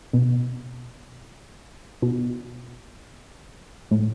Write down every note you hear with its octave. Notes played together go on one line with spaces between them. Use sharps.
B2
B2
A2